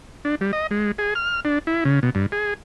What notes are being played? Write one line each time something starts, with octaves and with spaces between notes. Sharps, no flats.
D4
G3
D#5
G#3
G#4
F6
D4
E4
C#3
B2
G2
G#4